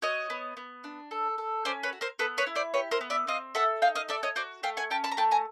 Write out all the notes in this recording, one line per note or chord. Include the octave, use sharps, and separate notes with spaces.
F#4 C#5 D#5
B3
B3
D4
A4
A4
C#4 C5 D5
B4 C#5
F#4
A#4 C5
B3 A4 B4
B4 C#5
E4
C5 D5
G4 B4 C#5
A#4 C5
B3
D5 E5
C4 D#5 F5
A4 E5 F#5
D#4 F5 G5
D#5 F5
A4 D5 E5
C#5 D#5
F#4 C5 D5
A3 F5 G5
F#5 G#5
C#4 G5 A5
A5 B5
A#5
A3 G5 A5
G#5 A#5